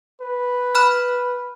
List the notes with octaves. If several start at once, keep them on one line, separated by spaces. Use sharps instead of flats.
B4
B5 F6 F#6